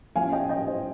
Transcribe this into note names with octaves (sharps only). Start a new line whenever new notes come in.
F3 A#3 C#4 F5 G#5
D#5 G5
D#5 G5
C5 D#5